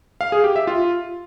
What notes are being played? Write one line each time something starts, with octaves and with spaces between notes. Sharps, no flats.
F5
G#4
G4
E5
F4